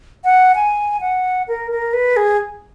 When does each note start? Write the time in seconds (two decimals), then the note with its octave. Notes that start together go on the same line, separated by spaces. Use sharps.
0.24 F#5
0.55 G#5
1.01 F#5
1.48 A#4
1.71 A#4
1.93 B4
2.17 G#4